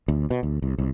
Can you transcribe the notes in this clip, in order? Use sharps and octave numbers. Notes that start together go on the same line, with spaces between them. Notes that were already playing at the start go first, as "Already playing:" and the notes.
D2
B2
D2
C2
C2